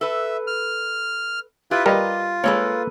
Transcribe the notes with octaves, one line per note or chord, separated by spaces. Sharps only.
A4 B4 E5
F6
E4 F4 G4 B4
G3 F4 A#4 B4 D#5 A#5
G#3 A#3 A4 B4 C#5